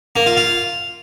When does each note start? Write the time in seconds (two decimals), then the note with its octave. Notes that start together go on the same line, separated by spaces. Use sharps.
0.16 A#3
0.26 F4
0.37 F4